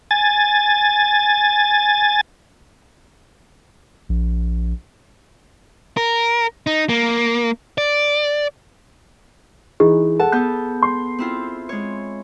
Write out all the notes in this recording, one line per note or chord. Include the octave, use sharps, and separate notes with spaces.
G#5 A6
A#1
A#4
D#4
A#3
D5
E3 D#4 G#4
A4 F#5 A5
B3 A4 G6
C6
C4 E4 F4
G#3 C#5